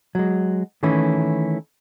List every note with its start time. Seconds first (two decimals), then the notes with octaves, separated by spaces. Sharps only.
0.15 F#3 G#3
0.83 D#3 E3 A3 C#4 E4